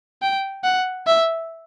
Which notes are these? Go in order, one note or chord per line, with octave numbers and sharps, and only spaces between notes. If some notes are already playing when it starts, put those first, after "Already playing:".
G5
F#5
E5